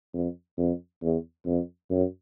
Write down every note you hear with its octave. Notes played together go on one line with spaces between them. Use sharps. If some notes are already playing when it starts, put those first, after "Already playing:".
F2
F2
E2
F2
F#2